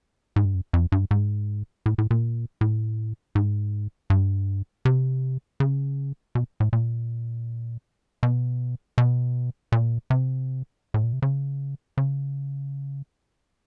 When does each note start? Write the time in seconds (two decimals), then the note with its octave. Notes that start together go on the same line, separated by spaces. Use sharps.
0.36 G#2
0.45 G2
0.54 F#2
0.73 F2
0.92 G2
1.11 G#2
1.86 A2
1.98 A2
2.11 A#2
2.61 A2
3.35 G#2
4.10 G2
4.85 C3
5.60 C#3
6.35 B2
6.60 A2
6.73 A#2
8.23 B2
8.98 B2
9.72 A#2
10.10 C3
10.94 A2
11.03 A#2
11.13 C3
11.22 C#3
11.97 C#3